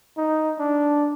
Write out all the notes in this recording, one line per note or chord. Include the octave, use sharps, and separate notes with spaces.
D#4
D4